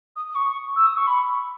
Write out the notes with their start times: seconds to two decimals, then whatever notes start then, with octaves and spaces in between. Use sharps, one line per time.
0.16 D#6
0.28 D#6
0.34 C#6
0.75 E6
0.86 D#6
0.96 C#6
1.06 B5